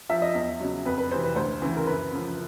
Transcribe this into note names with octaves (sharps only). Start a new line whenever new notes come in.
F3 E5
D#5
E2
C#3 F#3
F2 B4
B4
C3 E3 C5
B4
D2 C5
C#3 E3
A#4
F#2 B4
C#3 F3